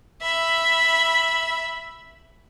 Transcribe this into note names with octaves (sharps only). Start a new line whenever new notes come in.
E5 B5